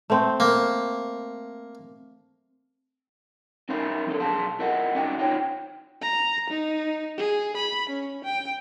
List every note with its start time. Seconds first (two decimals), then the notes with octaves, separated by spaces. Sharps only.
0.10 A3 C4
0.40 A#3
3.69 C#4 D#4 A#4 C5 E5 B5
4.06 F3 D4 A4
4.20 B1 G#4 F5 A5 C6
4.59 E4 A#4 D#5 F#5
4.95 C#4 D#4 F#4 D5 E5 G5
5.19 D#4 F4 C5 C#5 G5
6.02 A#5
6.50 D#4
7.18 G#4
7.57 B5
7.90 C#4
8.25 G5